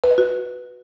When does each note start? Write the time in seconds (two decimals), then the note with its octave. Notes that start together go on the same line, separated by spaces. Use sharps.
0.04 B4
0.11 D#5
0.18 F#4